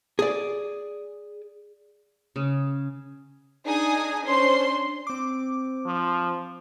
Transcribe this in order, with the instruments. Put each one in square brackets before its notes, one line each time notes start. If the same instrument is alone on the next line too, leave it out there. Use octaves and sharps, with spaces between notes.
[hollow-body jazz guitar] G#4 D5
[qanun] C#3
[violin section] D4 D#4 G#4 G#5 D#6
C#4 D4 C5 C6
[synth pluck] C4 D6
[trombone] F3